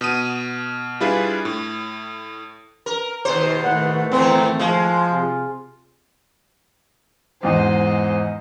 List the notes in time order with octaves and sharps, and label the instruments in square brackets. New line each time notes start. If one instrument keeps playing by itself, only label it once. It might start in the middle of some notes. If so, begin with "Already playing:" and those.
[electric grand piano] B2 D#6 D#7
G3 D4 E4 F4 G#4 B4
A2
[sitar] A#4
D#2 B2 C5
[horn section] A2 D#3 A3 [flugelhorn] F#5
[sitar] E2 B3 [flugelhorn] C4
[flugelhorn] F3 [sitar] G#3
[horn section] C3 F4
[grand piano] E2 G#2 [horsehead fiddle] C5 D#5